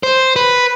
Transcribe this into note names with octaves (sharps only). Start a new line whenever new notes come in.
C5
B4